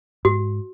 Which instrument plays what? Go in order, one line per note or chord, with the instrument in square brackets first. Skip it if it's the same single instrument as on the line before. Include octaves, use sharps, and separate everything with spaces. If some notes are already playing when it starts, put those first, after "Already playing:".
[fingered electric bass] G#2 [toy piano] F#4